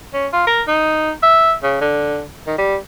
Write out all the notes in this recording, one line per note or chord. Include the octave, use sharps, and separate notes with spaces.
C#4
F4
A#4
D#4
E5
C#3
D3
D#3
G3